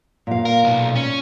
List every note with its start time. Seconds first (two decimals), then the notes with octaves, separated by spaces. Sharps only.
0.27 A#2 F5
0.45 A#4
0.64 B1
0.95 C#4